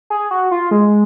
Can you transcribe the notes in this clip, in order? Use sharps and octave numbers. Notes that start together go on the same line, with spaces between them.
G#4
F#4
F4
G#3